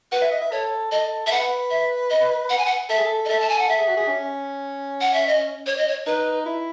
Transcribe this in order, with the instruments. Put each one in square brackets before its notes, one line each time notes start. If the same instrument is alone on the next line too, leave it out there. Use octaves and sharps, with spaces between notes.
[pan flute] B4 [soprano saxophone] F#5
[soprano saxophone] E5
D#5
E5
[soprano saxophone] A4 [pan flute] C#5
[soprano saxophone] A4 [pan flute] D#5
[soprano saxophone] A4 [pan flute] E5
[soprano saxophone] B4 [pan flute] F#5
[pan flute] E5
D#5
F#5
G#5
F#5
[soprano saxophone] A4 [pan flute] E5
[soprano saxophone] G#4
A4
[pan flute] D#5
[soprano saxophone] A4 [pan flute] E5
[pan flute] A5
G#5
F#5
[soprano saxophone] A4 [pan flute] E5
[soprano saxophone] G#4
F#4
G#4
C#4
[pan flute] F#5
E5
D#5
C#5
D#5
C#5
[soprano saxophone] D#4 [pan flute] B4
[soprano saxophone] E4